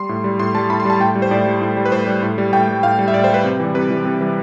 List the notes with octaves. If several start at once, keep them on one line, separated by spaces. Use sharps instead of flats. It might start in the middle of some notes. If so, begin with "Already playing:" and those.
Already playing: G3 C6
A2
G3
A2 C6
G3 A5
A2 B5
C6
G3 A5
A2 G5
G3
C5
A2 D5
G3
A2
G3
B4
A2 C5
G3
A2
G3
A2 G5
G3
A2 F5
G3
E5
A2 D5
C5
G3 B4
C3
E3 G3
C3 B4
E3 G3
C3
E3 G3